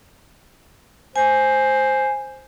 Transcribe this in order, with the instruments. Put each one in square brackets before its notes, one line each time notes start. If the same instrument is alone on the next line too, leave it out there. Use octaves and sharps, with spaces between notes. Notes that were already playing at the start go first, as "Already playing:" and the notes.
[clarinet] C5 [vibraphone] G#5